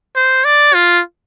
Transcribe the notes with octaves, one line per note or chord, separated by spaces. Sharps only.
C5
D5
F4